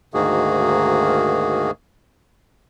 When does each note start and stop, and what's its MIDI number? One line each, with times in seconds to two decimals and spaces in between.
0.14 1.71 38
0.14 1.71 44
0.14 1.71 51
0.14 1.71 58
0.14 1.71 66
0.14 1.71 68